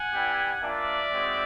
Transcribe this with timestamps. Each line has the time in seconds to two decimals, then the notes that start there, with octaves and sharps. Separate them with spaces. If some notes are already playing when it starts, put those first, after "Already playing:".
Already playing: F#5 G#5
0.13 G3 B3 E4 G4
0.62 A#3 D4 F4 D5 E5
1.11 G#3 C4 D#4 F#4